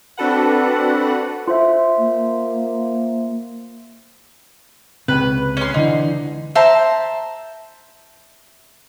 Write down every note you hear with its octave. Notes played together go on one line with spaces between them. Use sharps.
C4 D4 F#4 A4 B4 F#5
F4 C5 E5
A#3
C#2 C3 B4
C#4 C6
C#2 D3 E3 D#4
C5 E5 A5 A#5